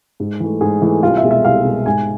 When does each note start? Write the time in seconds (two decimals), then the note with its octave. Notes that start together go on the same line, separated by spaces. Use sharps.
0.20 G#2
0.40 E3 A3
0.61 G#2 G#4
0.82 E3 A3
1.03 C2 F4
1.17 E5
1.24 B2 G#3
1.31 E5
1.44 C2 F5
1.65 B2 G#3
1.86 G#2 G#5